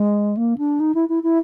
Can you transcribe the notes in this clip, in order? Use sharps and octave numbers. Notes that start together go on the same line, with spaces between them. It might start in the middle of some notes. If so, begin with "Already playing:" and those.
Already playing: G#3
A#3
D4
D#4
E4
E4
E4